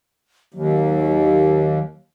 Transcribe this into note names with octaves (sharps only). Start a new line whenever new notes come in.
D#2 F#3